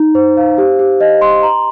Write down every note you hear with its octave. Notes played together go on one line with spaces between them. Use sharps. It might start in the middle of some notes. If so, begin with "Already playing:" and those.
Already playing: D#4 A#5
C5
F5
G4
G4
D#5
C6
A#5